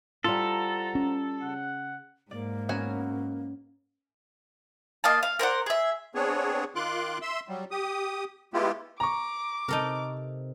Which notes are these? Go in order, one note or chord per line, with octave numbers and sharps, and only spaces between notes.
G3 F4 A4 C5 F#5 A#5
C#4
C#3 F#5
G#2 A#3 D5
F#3 B3 C#4 F#4 G#5
A#3 D#5 F5 A5
F5
A#4 C5 D5 F#5
G#4 E5
B3 C4 D4 G#4 C#5
D#3 F4 C6 D6 F#6
E5 C6 E6
F#3 G3
G4 D#6
G#3 A3 B3 E4 F4 G4
A#5 C#6 D6
C3 D#4 A4 A#4